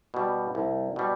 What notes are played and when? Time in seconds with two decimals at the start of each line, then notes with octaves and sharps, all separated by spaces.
0.14 B2 G3
0.55 C2
0.96 B2 G3